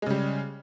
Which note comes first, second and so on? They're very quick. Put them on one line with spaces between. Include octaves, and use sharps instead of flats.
G#3 C#3 G3